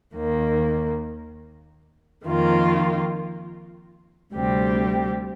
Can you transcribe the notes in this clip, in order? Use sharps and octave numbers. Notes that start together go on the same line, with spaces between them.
D#2 D#3 A#3
F2 D#3 A#3 F4
D2 C3 G3 C4 G4